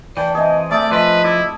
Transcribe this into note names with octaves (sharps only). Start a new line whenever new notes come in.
E3 D5 G5 A5
C3 G#4 D#5
A3 G#4 D5 E5
F3 B4 D#5
E4 D5